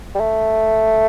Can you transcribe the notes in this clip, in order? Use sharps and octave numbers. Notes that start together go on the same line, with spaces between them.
G3
A3